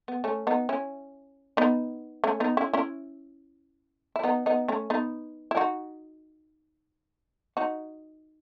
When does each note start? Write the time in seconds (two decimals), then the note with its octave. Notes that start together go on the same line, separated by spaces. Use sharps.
0.08 B3
0.24 A3 C#4
0.47 B3 D#4
0.69 C#4 E4
1.57 B3 D#4
2.24 A3 C#4
2.40 B3 D#4
2.57 C#4 E4
2.73 C#4 E4
4.16 E4
4.23 B3 D#4
4.46 B3 D#4
4.68 A3 C#4
4.90 B3 D#4
5.51 E4
5.57 D#4 F#4
7.57 D#4 F#4